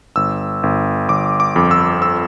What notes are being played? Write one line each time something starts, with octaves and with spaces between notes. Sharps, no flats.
G1 E6
G1
G1 D6
D6
F2
E6
E6